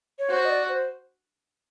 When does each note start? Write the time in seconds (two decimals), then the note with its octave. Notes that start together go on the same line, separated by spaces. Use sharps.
0.19 C#5
0.30 F#4 C5
0.45 D#5
0.50 D5
0.69 C5